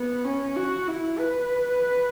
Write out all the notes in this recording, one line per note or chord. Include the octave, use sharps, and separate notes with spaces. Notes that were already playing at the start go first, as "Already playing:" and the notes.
Already playing: B3
C#4
F#4
E4
B4